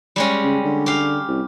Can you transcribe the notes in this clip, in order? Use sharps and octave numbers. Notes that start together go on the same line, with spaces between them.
G3 G#3 C#4
C#3
D3
G4 F5
C2